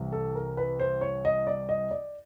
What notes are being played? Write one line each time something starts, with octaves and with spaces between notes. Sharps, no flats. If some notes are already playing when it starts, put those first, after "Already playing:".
Already playing: C2 C3 E3
A4
A#4
B4
C5
C#5
D#5
D5
D#5
D5